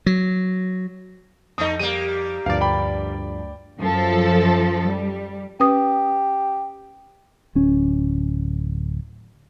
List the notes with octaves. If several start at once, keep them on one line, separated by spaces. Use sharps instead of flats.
F#3
F2 A3 D#4 D#5 D#6
G3 A#3 D#7
D2 G2 F3 D5 F5
G5 B5
F#2 F3 A4
G3
C#4 G4 B4 D#6
D1 C#4